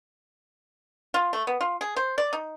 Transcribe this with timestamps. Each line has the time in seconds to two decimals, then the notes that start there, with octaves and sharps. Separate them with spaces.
1.14 F4
1.33 A3
1.47 B3
1.61 F4
1.81 G#4
1.96 C5
2.18 D5
2.33 D#4